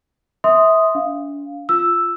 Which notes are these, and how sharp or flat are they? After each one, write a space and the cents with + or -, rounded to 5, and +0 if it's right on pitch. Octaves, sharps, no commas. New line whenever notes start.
E5 -25 C6 +0 D#6 +0
D4 -45 F5 +0
F4 +0 E6 +0